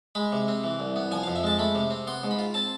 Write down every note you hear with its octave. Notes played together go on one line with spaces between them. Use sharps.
G#3 B5
C3
C4
E3
C2
B3
F3 G#5
F5
F2
E5
G#3 A5
A3 B5
C3
C4
B3 C6
G#2
B5
F4
C4 A5